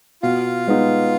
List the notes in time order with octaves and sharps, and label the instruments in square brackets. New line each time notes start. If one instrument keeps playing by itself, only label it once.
[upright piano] B2 [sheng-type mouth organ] F4 F5
[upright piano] G#3 B3 D#4